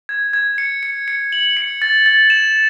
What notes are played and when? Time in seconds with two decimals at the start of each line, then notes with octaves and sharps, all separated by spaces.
0.09 G#6
0.33 G#6
0.58 C#7
0.83 C#7
1.08 C#7
1.32 F#7
1.57 C#7
1.82 A6
2.06 A6
2.30 E7